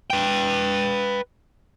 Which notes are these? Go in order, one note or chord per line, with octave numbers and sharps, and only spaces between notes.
B4 G5